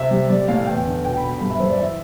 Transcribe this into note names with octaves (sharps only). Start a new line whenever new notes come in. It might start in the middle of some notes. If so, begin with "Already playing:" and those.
Already playing: C3 E5
G3
G3 D5
A2 F5
E2 G5
D3
B2 G5
B5
B2
B5
G2 B5
E5
G2 C5
D5
E3 E5